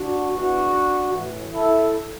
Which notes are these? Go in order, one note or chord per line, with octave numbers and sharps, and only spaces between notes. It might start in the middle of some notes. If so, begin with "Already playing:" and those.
Already playing: D4 F#4
E2 E3 D4 F#4
A2 E3
E4 A4